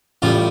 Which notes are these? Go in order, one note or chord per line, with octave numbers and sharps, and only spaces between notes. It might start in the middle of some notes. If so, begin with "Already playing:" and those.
A1 A2 G3 F4